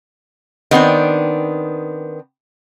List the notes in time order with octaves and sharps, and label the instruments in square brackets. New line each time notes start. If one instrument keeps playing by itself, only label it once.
[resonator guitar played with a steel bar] D#3 B3 C4 D4